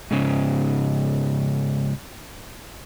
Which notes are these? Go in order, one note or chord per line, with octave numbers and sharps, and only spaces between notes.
G#2 C#3